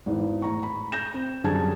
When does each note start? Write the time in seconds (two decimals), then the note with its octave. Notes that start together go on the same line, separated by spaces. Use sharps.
0.06 G#1 E2
0.42 A2 A#5 C#6
0.63 B5
0.92 G6 A#6 E7
1.14 C4
1.44 F#2 D3 G3 G#4 A5 G#6